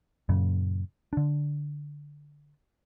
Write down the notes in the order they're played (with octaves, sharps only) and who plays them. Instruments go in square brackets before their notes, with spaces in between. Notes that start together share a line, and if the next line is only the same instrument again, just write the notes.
[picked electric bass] F#2 A#2 C#3
D3 D4